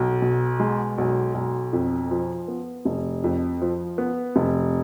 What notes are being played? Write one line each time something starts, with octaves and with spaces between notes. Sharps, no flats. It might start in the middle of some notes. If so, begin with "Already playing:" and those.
Already playing: B1
B2
G#3
B1
B1
F2
F3
B3
F1
F2
F3
B3
F1